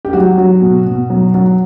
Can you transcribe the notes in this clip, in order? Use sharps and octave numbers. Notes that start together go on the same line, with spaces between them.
G4
F#3 F#4
F#3
B2
B2
F#3
F#3